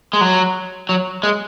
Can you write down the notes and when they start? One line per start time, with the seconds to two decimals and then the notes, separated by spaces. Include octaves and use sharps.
0.13 G#3
0.21 F#3
0.89 F#3
1.23 G#3